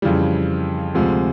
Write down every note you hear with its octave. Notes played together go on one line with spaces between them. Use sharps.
F2 C#3 E3 G3
D2 C3 F3 G#3